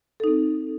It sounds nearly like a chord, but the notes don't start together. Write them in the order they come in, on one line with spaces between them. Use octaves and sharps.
A4 D#4 C4